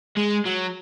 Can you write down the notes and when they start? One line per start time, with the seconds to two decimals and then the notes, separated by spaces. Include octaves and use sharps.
0.17 G#3
0.46 F#3